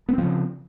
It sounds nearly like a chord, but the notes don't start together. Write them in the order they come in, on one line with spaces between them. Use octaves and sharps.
B3 C4 F3 C#3